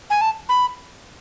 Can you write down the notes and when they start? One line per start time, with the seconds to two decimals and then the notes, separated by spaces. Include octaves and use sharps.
0.10 G#5
0.21 A5
0.49 B5